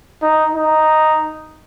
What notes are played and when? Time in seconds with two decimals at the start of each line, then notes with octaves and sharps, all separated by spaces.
0.23 D#4
0.55 D#4